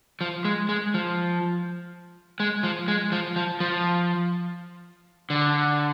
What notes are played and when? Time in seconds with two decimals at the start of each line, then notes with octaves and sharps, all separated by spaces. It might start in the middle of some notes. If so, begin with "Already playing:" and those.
0.21 F3
0.45 G#3
0.69 G#3
0.94 F3
2.40 G#3
2.63 F3
2.88 G#3
3.12 F3
3.36 F3
3.60 F3
5.30 D3